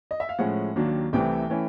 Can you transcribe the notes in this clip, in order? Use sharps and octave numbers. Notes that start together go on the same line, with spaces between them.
D#5
E5
F5
A2 F3 G#3 C#4 F#5
D#2 D#3 F#3 A#3 D4
C2 C3 E3 A3 G5
E3 A3 C#4 E4